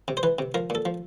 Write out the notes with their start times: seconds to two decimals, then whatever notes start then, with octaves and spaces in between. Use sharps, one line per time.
0.08 C3
0.17 C5
0.23 E3 B4
0.39 C3
0.54 F3 A#4
0.70 A#2 A4
0.85 F3